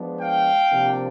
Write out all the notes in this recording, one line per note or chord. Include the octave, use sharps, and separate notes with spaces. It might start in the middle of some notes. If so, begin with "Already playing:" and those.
Already playing: F3 G#3 B3 D4
F5 G5
C3 F3 A#3 D4